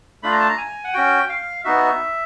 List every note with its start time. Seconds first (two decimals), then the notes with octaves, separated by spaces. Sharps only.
0.23 A3 D4 F4 B5
0.32 A#5
0.40 A5
0.49 A#5
0.58 G#5
0.84 F#5
0.93 C#4 F#4 G5
1.29 F5
1.64 B3 D#4 F#4 E5